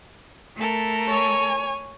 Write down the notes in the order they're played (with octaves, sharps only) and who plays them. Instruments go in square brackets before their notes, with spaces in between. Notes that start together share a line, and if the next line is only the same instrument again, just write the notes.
[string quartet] A3 A4 A#4
[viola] C#5 G#5